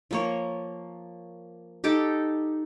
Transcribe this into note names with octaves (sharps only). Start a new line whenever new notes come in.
F3 A#3 C#5
D#4 G4 A4 D6